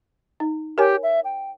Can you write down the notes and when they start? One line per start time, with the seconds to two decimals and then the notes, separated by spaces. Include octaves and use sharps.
0.40 D#4
0.78 G4 A#4 C#5 G#5
1.03 E5
1.25 G5